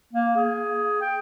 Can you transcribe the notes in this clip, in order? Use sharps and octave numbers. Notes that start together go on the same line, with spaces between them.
A#3
G#4
G5